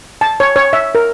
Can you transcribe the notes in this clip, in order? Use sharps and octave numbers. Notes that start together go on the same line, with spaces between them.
A5
C#5
C#5
E5
A#4